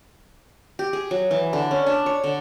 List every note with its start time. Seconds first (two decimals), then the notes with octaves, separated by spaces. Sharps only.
0.79 G4
0.93 G#4
1.11 F#3
1.31 E3
1.53 D3
1.71 C#4
1.86 D4
2.06 C#5
2.24 D3